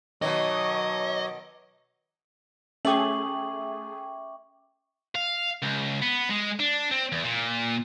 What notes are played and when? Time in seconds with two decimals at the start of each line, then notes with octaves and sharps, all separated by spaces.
0.22 B2 D#3 F#3 C#5 D#5 D6
2.85 A3 C#4 G#4 E5 G5 C#6 D6 F#7
5.15 F5
5.63 C#2
6.02 B3
6.29 G#3
6.59 D4
6.91 C4
7.12 E2
7.24 A#2